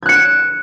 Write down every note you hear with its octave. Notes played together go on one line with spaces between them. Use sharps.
F#6 G#6 C#7 D7 E7